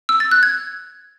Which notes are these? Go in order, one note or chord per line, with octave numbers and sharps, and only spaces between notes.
E6
A6
F#6
G#6